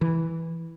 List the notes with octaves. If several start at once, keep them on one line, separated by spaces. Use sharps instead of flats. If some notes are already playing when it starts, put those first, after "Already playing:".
E3